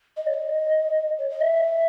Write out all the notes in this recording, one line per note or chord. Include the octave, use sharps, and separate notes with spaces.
D#5
C#5
D#5
C#5
D#5
E5